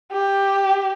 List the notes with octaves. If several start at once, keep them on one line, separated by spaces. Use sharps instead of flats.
G4